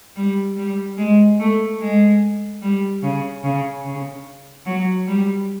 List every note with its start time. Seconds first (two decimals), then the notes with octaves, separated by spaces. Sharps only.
0.16 G3
0.56 G3
0.97 G#3
1.39 A3
1.80 G#3
2.62 G3
3.03 C#3
3.44 C#3
3.85 C#3
4.66 F#3
5.07 G3